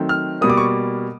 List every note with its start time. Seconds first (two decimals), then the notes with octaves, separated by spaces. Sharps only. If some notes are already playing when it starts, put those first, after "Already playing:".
Already playing: D#3 F#3 A3 C4
0.09 F6
0.41 B2 G3 A#3 D#6
0.50 D6
0.57 C#6